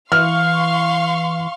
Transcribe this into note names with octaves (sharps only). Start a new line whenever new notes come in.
E3 F5 C6 C#6 F6